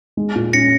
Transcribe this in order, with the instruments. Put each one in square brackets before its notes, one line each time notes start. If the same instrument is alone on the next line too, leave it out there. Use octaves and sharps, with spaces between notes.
[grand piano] G#3
A#2
[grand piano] C#4 [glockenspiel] A#6 C#7